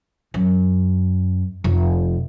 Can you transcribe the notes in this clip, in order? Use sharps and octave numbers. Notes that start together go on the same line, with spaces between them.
F#2
F1